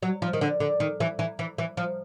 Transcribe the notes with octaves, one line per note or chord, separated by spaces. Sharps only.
F#3
F3
D#3
D3
D3
D#3
E3
E3
E3
E3
F3